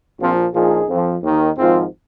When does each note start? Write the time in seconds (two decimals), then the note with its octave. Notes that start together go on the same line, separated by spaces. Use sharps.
0.19 A#1 A#2 F3 C4 F4
0.53 A#1 A#2 F3 D#4 G#4
0.88 F2 F3
1.23 D#2 D#3
1.57 G#1 G#2 F3 C4 F4